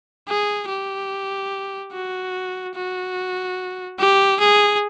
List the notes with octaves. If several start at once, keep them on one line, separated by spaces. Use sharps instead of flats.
G#4
G4
F#4
F#4
G4
G#4